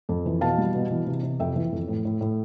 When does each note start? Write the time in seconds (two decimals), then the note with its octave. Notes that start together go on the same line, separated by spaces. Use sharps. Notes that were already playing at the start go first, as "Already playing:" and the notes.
0.09 F2
0.26 E3
0.41 B2 F5 A5
0.58 G3
0.75 B2
0.91 E3
1.07 C3
1.23 C3
1.40 F2 E5 G5
1.56 E3
1.72 F2
1.88 A2
2.05 A2
2.21 A2